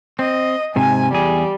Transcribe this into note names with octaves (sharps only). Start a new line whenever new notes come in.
C4 D#5
G#2 C3 G#5
E2 G3 G#4